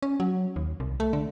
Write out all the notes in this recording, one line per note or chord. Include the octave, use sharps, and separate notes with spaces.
C#4
F#3
D#2
C2
A3
D3